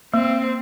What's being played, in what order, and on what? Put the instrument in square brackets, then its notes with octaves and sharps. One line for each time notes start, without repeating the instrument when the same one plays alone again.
[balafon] A#3 [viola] C4